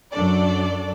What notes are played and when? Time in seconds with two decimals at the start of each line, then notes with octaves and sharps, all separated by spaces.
0.13 F#2 F#3 D4 A4 D5